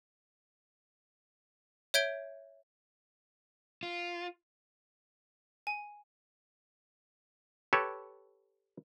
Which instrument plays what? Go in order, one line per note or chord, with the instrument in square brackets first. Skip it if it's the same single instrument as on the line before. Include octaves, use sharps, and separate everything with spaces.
[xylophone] C#5 E5 G6 G#6 D7 G7
[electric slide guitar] F4
[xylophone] G#5
[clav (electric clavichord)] G4 A4 B4 C#5